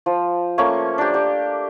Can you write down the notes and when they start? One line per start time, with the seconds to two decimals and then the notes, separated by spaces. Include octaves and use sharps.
0.06 F3
0.58 A3 A#3 C#4
0.98 D4 G4
1.14 G4